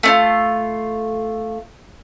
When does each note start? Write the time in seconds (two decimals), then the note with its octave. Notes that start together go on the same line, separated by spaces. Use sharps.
0.03 A3 D4 F4